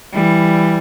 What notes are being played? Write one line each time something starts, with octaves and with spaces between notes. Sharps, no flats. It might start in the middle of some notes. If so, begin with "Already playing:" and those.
E3 G3